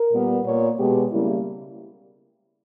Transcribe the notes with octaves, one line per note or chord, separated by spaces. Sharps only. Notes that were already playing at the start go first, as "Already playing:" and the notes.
Already playing: A#4
A#2 G3 B3
A#2 A#3 C#5
B2 G#3 B3 G4
C#3 G3 A#3 E4